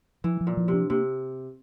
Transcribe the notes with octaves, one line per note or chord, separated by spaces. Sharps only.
E3 F3
F3
A#2
F3
C3
D4
C3 A#3